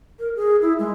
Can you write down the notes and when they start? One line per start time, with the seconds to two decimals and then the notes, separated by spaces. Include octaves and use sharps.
0.19 A#4
0.36 G#4
0.62 E4
0.79 G#3